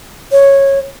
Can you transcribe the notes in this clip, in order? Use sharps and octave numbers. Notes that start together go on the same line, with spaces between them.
C#5